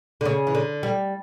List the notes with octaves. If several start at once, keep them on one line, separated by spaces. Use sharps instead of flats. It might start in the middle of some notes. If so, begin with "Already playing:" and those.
D3
C#3
E3
D3
G3